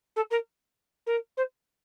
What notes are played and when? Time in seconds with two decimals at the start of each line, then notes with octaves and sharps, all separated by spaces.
0.16 A4
0.30 A#4
1.06 A#4
1.37 C5